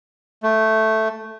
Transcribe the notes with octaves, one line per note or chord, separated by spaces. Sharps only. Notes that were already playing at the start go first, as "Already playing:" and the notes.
A3